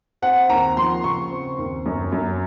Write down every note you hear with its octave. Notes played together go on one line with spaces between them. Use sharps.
C4 F#5
D#2 A#5
F3 C6
C#3 C#6
C4
D#2
F#2
F#2